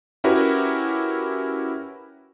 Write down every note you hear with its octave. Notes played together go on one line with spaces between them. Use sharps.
C#4 E4 F#4 G4 A#4 B4